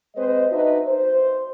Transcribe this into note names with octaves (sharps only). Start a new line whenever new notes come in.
G#3 C4 B4 C5 D#5
D4 D#4 F#4 B4 D#5 E5
C5